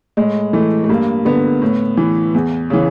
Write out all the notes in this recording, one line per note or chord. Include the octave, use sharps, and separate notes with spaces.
A2 G#3
E3 A3
A3
G2 A#3
D3 B3
A2
E3
E2
C#3 E3